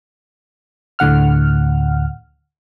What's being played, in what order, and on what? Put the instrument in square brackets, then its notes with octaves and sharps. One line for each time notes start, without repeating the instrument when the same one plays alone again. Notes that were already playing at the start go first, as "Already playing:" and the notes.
[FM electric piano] D2 A2 D3 F#5 F6